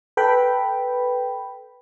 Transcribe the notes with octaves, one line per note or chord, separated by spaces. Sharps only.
A4 B4 G5 B5